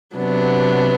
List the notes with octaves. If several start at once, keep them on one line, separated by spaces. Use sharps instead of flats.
C3 F#3 B3 D4